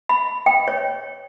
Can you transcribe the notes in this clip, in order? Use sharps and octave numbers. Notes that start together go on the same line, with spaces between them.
B5
G5
C#5